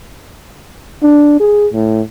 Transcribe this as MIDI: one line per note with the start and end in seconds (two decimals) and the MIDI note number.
1.02 1.36 62
1.40 1.67 68
1.73 2.02 45